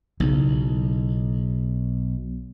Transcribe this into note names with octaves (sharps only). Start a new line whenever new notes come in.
B1 C#3 E4